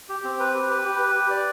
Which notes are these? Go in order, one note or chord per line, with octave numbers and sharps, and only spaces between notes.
G4
C4
B4
G4
B4
G4
B4
G4
D5